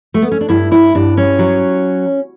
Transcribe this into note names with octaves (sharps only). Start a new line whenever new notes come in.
A3
B3
C#4
D4
G2 E4
E4
G2 D4
C#4
F#3